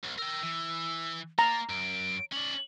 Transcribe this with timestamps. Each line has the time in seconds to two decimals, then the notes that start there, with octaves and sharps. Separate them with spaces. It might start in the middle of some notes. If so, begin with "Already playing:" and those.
0.04 B1
0.18 A#4 G5 E6
0.43 E3
1.39 A#3 A#5 A6
1.69 F#2 D7
2.33 C#4 D5 F#7